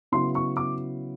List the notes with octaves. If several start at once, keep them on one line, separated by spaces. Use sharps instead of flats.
C#3 F#3 B3 E4 C6
C#6
D6